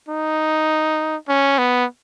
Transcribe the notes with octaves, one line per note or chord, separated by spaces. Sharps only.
D#4
C#4
B3